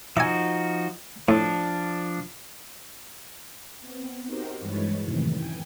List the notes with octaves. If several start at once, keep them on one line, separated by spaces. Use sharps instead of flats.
F3 D#4 F#4 E5 G#5
A2 F3 D4
B3 C4
D#4 F#4 G4 A#4 C5
G2 E3 G#3 B4 C#5 A6
F#2 A2 C3 D#3 E3
G5 G#5